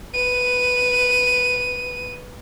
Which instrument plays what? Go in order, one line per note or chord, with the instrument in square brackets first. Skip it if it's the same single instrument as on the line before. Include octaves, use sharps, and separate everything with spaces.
[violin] B4 D#7